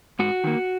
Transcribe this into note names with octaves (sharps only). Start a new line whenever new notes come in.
G#2 F#4
D#3 A#3